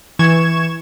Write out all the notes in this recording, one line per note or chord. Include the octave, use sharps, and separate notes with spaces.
E3 C#6 G#6 E7